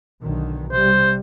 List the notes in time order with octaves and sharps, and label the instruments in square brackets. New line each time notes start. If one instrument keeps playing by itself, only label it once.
[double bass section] B1 D3 D#3
[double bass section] C3 G3 [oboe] C5